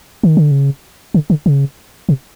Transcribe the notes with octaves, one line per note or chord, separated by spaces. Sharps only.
D#3
D3
C#3
D3
D3
C#3
C3